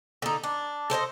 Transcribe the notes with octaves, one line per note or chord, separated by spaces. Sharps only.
D3 D#4
D4
A4 C5 C#5 D#5